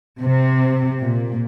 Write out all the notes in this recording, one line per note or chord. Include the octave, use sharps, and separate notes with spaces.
C3
A#2